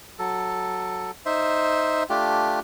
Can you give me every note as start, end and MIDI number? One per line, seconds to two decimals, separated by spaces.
0.19 1.11 54
0.19 1.11 69
1.26 2.03 63
1.26 2.03 72
1.26 2.03 76
2.09 2.60 57
2.09 2.60 62
2.09 2.60 65
2.09 2.60 67